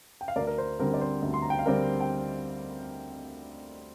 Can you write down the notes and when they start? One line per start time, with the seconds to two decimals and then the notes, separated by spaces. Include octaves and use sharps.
0.21 G5
0.28 F5
0.36 D2 A#4 D5
0.47 A#4
0.58 C5
0.79 D3 G3 C4 A#4
0.94 D5
1.01 C5
1.22 D2
1.34 C6
1.42 A#5
1.50 G5
1.59 F5
1.66 D3 G3 C4 A#4 D5
2.00 G5